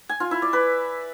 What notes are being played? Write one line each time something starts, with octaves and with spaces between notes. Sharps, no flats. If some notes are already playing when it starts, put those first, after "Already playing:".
G#5
F4
E4
D5
B4